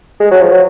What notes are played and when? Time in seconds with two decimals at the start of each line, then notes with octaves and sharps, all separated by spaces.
0.20 G#3
0.31 F#3
0.41 F3
0.52 F#3